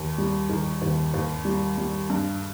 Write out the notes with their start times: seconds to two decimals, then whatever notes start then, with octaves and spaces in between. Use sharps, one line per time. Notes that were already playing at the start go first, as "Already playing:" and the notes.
Already playing: D#2 D#3
0.18 G3
0.49 D#3
0.82 D#2
1.14 D#2
1.45 G3
1.78 G3
2.10 G2